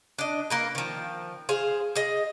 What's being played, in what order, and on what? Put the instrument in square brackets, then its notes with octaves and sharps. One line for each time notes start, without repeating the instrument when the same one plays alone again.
[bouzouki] D4 D#5
A#3 A#4 B4
D#3 F3
G#4 C5 F5
G#4 D#5